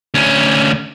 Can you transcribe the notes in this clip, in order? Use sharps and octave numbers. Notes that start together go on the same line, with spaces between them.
D2 C#4